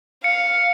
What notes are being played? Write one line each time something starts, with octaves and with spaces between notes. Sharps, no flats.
F5 C#7